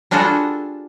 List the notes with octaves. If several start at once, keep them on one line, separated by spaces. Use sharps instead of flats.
G3 D4 F4 F#4 G#4 A4